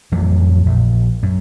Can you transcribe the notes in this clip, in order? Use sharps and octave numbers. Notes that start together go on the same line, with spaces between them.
A1 F2 E3 F#3
A#1
F#2